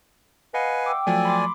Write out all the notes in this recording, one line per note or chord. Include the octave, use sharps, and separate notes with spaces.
B4 D#5 F5 F#5 G#5
G5 D6 E6
F3 F#3 A3 D5 G#5
B5 C6 D6